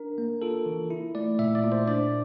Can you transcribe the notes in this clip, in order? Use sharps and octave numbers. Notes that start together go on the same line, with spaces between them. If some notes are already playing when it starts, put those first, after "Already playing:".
Already playing: D4 A#4
A#3
F4 A4
E3
E4
A3 D5
A#2 E5
D5
A#2
C5
D4 D5